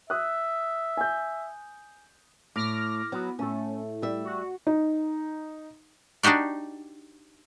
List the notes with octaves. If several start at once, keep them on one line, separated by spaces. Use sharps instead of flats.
E5 D#6 F#6
G#5 G6
A2 D6 F6 A#6
F#3 B3
A2 A3 C#4
G3 E5
F#4
D#4
D4 D#4 F#4 G4 D5